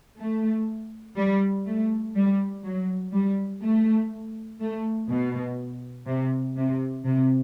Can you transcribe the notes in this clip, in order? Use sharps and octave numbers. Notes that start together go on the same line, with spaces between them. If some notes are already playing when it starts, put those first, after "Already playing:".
A3
G3
A3
G3
F#3
G3
A3
A3
B2
C3
C3
C3